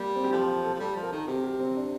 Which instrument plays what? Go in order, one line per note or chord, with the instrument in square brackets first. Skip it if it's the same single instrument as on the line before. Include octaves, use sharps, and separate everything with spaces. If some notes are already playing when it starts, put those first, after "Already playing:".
Already playing: [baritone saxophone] G3 [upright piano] A#3
[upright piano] C4
G4
[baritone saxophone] F3 [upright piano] A4
[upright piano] A4
[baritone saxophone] F3
[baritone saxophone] G3 [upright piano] A4
[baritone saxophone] F3
[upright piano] A#4
[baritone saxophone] D#3 [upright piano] A4
[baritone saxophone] C3 [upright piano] G4
[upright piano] G4
C4
D4